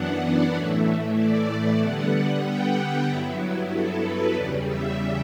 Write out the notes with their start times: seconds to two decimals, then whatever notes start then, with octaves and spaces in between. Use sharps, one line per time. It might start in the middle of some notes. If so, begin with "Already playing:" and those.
Already playing: F#2 E3 B3 D4 F#5
0.22 D5
0.54 A2 E3 A3 E4 C#5
1.17 D5
1.81 D3 G3 B3 F#5
2.44 G5
2.76 F#5
3.08 G2 F#3 B3 E4 E5
3.71 A4
4.03 B4
4.34 E2 C#3 G3 D5
4.66 E5